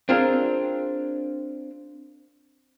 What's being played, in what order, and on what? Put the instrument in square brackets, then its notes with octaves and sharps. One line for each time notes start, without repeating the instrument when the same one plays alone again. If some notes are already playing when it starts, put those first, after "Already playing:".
[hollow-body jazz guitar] C4 D4 F4 G#4 A#4